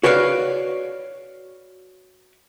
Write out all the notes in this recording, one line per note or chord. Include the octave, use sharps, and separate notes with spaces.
F#4 B4 C#5 D5 F5